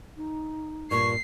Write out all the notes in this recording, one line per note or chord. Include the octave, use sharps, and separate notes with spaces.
D#4
G2 A#2 C#6 C7